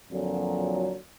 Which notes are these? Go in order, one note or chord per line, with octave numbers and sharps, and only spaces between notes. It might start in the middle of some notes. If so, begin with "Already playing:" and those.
F2 A#2 D3 F#3